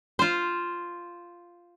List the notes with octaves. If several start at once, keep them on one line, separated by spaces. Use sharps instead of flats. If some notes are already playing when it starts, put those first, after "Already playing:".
F4 C5